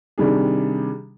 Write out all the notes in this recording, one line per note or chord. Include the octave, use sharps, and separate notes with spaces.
C3 D#3 G3 D4 G#4